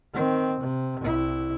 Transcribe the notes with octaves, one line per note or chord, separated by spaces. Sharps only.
D#3 C4
C3
C2 E4